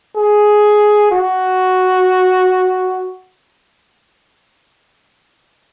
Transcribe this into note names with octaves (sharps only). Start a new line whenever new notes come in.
G#4
F#4